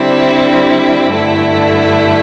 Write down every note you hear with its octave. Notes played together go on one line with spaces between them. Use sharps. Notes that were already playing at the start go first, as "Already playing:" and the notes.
Already playing: D3 G3 C4 E4
G2 D3 A3 E4